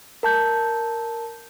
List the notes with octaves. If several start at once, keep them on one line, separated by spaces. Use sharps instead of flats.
A#4 A5 G6